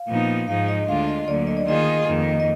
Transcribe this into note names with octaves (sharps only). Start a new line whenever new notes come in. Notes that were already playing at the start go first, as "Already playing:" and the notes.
Already playing: F5
A#2 F3 B3 D#4
G#2 F3 G#3 D#4 F5
D#5
D2 D3 G#3 D4 F4 F5
D#5
D2 D3 F#3 A#3 D5
D#5
D5
D#3 A#3 F4 G#4 D#5
F2 D#3 A#3
D#5